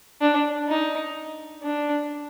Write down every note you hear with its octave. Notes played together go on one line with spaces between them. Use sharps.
D4
D#4
D4